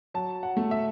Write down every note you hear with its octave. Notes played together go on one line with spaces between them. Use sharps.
F#3 A5
F#5
A3
E5